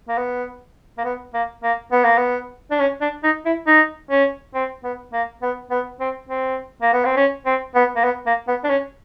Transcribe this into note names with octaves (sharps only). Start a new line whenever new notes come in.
A#3
B3
A#3
B3
A#3
A#3
B3
A#3
B3
D4
C#4
D4
D#4
E4
D#4
C#4
C4
B3
A#3
B3
B3
C4
C4
A#3
B3
C4
C#4
C4
B3
A#3
B3
A#3
B3
D4
C#4